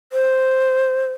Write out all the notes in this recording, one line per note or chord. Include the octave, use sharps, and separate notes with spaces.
C5